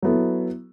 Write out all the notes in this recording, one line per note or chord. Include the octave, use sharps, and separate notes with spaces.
F#3 B3 E4 A4